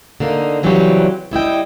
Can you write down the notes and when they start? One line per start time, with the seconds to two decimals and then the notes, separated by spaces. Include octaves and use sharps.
0.20 D3 A#3 D#4
0.63 C#3 E3 F#3 G3 C4 G4
1.31 G3 E4 D#5 G5